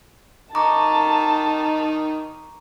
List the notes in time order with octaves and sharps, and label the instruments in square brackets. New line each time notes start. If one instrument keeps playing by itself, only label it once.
[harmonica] D#3 D#4 [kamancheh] A5 [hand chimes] A#5 C#6 D6